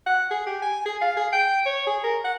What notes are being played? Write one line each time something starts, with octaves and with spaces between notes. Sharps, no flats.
F#5
G#4
G4
G#5
G#4
F5
G#4
G5
C#5
G#4
A#4
F#5